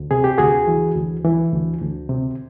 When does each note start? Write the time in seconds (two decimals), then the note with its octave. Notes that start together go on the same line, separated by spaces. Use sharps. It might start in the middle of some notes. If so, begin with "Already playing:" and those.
Already playing: D2
0.11 C3 G#4
0.24 G4
0.38 D2 F#4 G#4
0.68 E3
0.96 D2
1.25 E3
1.53 D2
1.82 D2
2.10 C3